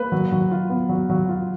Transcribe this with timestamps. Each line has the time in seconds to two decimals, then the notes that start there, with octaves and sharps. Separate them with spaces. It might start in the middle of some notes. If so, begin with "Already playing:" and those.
Already playing: A#3 B4
0.12 F#3
0.32 F#3
0.51 F4
0.70 B3
0.89 F#3
1.10 F#3
1.29 F4